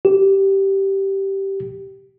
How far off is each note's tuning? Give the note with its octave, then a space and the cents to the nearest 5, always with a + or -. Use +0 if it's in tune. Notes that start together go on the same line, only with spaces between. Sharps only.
G4 -10